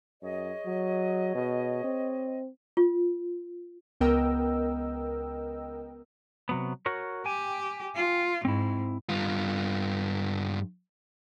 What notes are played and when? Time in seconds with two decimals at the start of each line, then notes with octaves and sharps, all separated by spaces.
0.22 F#2 G#4 C#5 D#5
0.66 F#3
1.35 B2
1.84 C4
2.77 F4
4.01 C#2 B3 A#4 D#5 G5 E6
6.49 C3 F#3 B3
6.86 F#4 A#4 C#5
7.26 G4 G5 G#5
7.95 F4
8.45 G#2 C4 E4
9.09 G2 F4